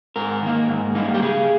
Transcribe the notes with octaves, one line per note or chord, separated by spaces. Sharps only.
G#2 A#4
D#3 A#3
G#2
G3 A#3 D#4
G4
C#3 G#4